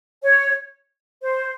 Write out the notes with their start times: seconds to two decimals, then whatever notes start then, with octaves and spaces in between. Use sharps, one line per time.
0.23 C#5
1.22 C5